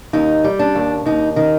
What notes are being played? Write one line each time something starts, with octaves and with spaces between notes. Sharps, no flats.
D#2 D#4
G3
D4
D#2
D#2 D#4
D#3 D#4